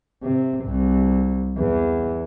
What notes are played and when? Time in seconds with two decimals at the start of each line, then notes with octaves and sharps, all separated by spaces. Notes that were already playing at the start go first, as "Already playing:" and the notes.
0.23 C3
0.66 C2
1.57 E2